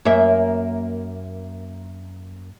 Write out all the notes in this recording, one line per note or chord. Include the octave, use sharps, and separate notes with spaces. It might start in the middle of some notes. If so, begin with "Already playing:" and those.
F#2 A#3 E5